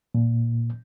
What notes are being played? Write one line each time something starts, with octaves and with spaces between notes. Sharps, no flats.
A#2